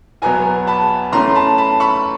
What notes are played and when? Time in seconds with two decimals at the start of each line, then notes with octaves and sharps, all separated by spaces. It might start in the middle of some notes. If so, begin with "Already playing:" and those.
0.22 E2 B2 F#3 B3 G#5 A#5
0.67 A5 B5
1.13 E3 A3 C#4 A#5 C6
1.35 A5 B5
1.58 A5 B5
1.80 B5 C#6